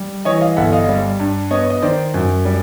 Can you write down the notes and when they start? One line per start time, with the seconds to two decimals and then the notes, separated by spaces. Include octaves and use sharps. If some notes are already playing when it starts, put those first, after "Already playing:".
Already playing: G3
0.25 E3 C#5 D#5
0.41 D#5 F5
0.56 G1 E5 F#5
0.72 D#5 F5
0.89 G3
1.20 G2
1.51 B3 C#5 D#5
1.70 D#5
1.82 D#3 C5 D5
2.14 F#2
2.45 G3